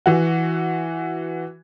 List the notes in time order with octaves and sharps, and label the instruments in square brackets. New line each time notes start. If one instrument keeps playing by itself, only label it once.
[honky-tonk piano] E3 F#4